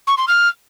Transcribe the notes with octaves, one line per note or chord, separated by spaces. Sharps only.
C#6
C6
F6